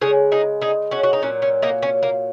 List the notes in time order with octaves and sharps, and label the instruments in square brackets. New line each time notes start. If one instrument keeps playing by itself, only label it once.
[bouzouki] C#3 G#3 G#4 C#5
D#4 G#4
D#4 G#4
C#4 F#4
F#4
D#4
A#2 F#3 C#4
C#4
A#3 D#4
C#4
A#3